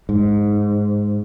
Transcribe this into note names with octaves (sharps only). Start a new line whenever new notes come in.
G#2